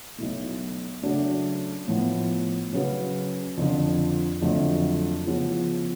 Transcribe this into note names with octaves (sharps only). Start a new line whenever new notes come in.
B1 B2 A3
C#3 F#3 A3 D4 F#4
A2 F3 B3
C#3 F#3 C#4 F#4 B4
F2 D3 F3
F2 D3 F#3 A3
C#3 F3 B3 F4 G#4